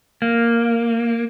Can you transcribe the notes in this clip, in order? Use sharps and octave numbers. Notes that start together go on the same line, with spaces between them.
A#3